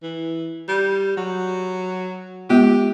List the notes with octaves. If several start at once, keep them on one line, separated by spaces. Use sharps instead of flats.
E3
G3
F#3
G#3 B3 F4 G4